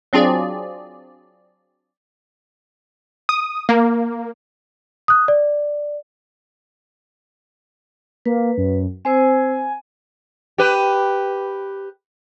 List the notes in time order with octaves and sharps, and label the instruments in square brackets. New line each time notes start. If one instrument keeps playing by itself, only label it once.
[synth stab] F#3 C4 D4 F4 G#4 D5
[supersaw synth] D#6
A#3
[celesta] D#6 F#6
D5
[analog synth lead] A#3 [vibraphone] B4
[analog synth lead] F#2
[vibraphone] C4 C5 E6 [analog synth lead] G#5
[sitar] G4 B4